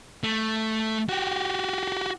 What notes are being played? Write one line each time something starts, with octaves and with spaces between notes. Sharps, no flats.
A3
F#4 G4